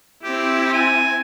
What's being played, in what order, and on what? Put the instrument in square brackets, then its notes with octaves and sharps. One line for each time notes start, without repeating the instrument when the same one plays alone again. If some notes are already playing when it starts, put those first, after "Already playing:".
[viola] C4 E4 [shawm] G4
[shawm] G#5